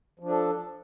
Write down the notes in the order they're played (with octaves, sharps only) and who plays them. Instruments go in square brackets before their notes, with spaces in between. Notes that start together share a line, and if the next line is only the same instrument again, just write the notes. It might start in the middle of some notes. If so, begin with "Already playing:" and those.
[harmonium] F3
D4
A4